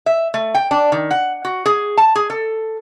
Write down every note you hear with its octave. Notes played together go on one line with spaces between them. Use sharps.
E5
A3
G5
D4
D#3
F#5
F#4
G#4
A5
G#4
A4